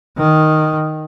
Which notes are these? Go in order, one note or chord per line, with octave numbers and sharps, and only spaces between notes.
D#3